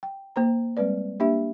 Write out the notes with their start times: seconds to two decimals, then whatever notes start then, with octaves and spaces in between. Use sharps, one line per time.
0.03 G5
0.36 A#3 C5 A#5
0.77 G3 G#3 C4 B4 D5
1.20 A#3 D4 G4 E5